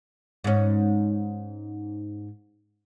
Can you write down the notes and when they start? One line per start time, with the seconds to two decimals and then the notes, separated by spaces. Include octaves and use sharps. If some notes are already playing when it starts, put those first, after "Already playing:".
0.44 G#2 C#4